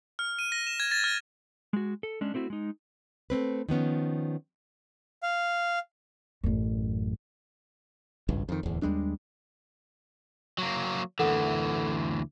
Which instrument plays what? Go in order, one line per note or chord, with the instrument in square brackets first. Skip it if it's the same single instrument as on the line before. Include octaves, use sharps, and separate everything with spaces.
[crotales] F6
D#7
A#6
E7
G#6
A6
F6
[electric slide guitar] G#3 F#4
A4
G#3 C#4 D4
A3 C4 E4 F#4
G#3 D#4
[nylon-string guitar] A3 A#3 C4 B4
D#3 F3 B3 C#4
[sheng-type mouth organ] F5
[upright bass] A1 F#2
[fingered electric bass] G#1 C#2 G2
F2 D#3
D1 E2
D#2 G3 G#3 D4
[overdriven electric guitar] F#3 A#3
[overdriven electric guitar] D2 E3 [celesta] A4 A#4 F#5